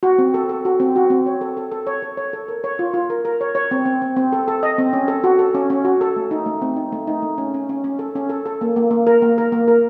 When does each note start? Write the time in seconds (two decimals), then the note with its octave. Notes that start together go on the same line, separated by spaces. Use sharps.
0.03 F#4
0.18 C4
0.34 A4
0.49 A4
0.65 F#4
0.80 C4
0.96 F#4
1.10 C4
1.26 C#5
1.41 A4
1.57 A4
1.72 A4
1.87 C#5
2.02 A4
2.17 C#5
2.33 A4
2.48 A#4
2.64 C#5
2.79 F4
2.94 F4
3.10 A#4
3.25 A#4
3.41 C#5
3.55 C#5
3.71 C4
3.85 C4
4.02 C4
4.17 C4
4.32 A4
4.48 A4
4.63 D#5
4.78 C4
4.93 C#4
5.08 A4
5.24 F#4
5.39 A4
5.55 C#4
5.70 C#4
5.85 F#4
6.01 A4
6.16 A3
6.31 D#4
6.46 A3
6.62 C4
6.76 D#4
6.92 A3
7.07 D#4
7.22 A3
7.38 C#4
7.54 C#4
7.69 C#4
7.84 C#4
7.99 A4
8.15 C#4
8.30 A4
8.46 A4
8.61 A#3
8.76 A#3
8.91 A#3
9.07 A#4
9.22 A#3
9.38 A#4
9.52 A#3
9.68 A#4